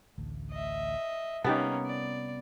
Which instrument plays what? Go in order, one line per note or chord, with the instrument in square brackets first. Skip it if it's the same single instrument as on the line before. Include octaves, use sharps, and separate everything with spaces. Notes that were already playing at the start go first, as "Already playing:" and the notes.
[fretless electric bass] A1 D2 A3
[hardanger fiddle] D#5 E5
[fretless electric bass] C3 G3 [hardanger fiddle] A#3 C#4 [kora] B3 [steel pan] D#4 G4 A5
[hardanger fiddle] D5